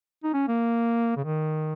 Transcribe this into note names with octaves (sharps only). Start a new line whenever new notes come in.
D#4
C#4
A#3
C#3
D#3